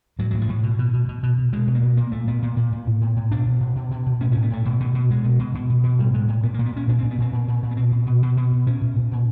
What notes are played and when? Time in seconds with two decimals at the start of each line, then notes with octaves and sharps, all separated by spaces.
0.19 A2 F#3
0.31 A2 F#3
0.41 F3
0.48 A2
0.63 B2
0.79 B2
0.93 B2
1.08 B2
1.23 B2
1.38 B2
1.53 B2 G#3
1.67 B2
1.75 A#3
1.83 B2
1.97 A#2 A#3
2.12 A#2 A3
2.27 A#2 B3
2.42 A#2
2.57 A#2
2.72 A#2
2.87 A2
3.01 A2
3.16 A2
3.31 B2 D4
3.46 B2
3.60 B2
3.76 B2
3.91 B2
4.06 B2
4.20 A2 C#4
4.32 C#4
4.36 A2
4.43 B3
4.50 A2 A3
4.65 B2
4.80 B2
4.95 B2
5.10 B2 G#3
5.24 B2
5.39 B2
5.54 B2
5.70 B2
5.83 B2
5.99 A2 G3
6.13 A2 G#3
6.28 A2
6.43 A#2 B3
6.54 A#3
6.59 A#2
6.66 B3
6.73 A#2 C#4
6.87 A#2 D4
6.99 C4
7.02 A#2
7.11 B3
7.18 A#2 C4
7.33 A#2
7.48 A#2
7.63 A#2
7.71 B3
7.77 B2 C4
7.92 B2
8.06 B2
8.22 B2
8.37 B2
8.52 B2
8.66 A#2 C#4
8.81 A#2
8.96 A#2
9.11 A#2